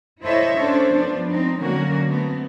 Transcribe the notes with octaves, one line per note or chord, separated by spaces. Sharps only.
E4 A4 C5 C#5 D#5 E5
C#4 D4 A4 C5 C#5
F3 B3 D4
C4 D#4
D3 F#3 A#3 C#4 F#4 A#4
A3 B3 C4